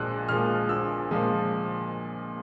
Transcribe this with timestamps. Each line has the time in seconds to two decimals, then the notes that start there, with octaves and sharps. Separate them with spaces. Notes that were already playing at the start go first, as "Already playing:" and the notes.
Already playing: A#1 A#2 F3 G#3 E6 F#6
0.29 A#2 F3 G#3 F6
0.69 A#1 E6
1.11 A#2 F3 G#3